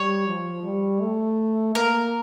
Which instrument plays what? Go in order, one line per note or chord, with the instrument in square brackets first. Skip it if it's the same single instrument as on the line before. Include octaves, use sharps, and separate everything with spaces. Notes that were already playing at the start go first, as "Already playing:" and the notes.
Already playing: [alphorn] G3 [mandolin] C#5
[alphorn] F3
G3
A3
[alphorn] A#3 [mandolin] A#4